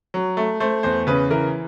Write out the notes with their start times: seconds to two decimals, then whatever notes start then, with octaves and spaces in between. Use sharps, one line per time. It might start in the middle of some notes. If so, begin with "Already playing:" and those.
0.14 F#3
0.37 A3
0.60 A3 C5
0.83 E2 C5
1.07 C#3 B4
1.30 E3 A#4